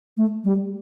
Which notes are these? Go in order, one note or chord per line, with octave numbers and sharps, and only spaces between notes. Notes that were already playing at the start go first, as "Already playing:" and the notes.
A3
G3